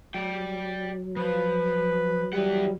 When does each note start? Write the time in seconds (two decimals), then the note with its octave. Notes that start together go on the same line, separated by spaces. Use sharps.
0.14 F#3 D5 G5
1.17 F3 B4
2.33 E3 G3 B4 F#5